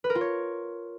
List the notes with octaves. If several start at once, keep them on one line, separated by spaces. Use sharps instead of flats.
B4
A#4
F4
C#5